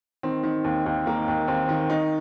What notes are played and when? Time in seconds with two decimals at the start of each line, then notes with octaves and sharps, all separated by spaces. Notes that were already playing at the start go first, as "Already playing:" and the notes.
0.23 D#3 C4
0.43 D#3
0.64 D#2
0.86 D#2
1.06 D#3 A#3
1.28 D#2
1.48 D#2 C4
1.69 D#3
1.90 D#3 D#4